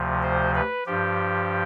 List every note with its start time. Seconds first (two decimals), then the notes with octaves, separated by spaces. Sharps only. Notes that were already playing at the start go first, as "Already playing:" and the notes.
Already playing: D2 C3 F3
0.23 C5
0.55 B4
0.86 G2 F3 G4